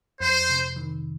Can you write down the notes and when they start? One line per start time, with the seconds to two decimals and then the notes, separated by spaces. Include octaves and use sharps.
0.20 F2 C5
0.49 C3
0.76 D#3